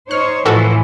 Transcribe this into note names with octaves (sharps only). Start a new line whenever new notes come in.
D#4 C5 C#5 F6
A2 E3 F3 F#4 A4